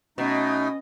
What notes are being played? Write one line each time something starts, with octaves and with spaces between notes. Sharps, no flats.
B2 A3 C#4 D#4 D#5